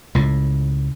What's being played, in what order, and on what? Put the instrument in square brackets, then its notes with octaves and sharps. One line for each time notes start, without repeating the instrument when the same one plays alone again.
[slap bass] C#2 A2